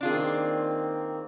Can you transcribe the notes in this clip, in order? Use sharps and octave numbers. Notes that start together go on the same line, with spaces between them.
D#3 A#3 C4 D4 F4 G#4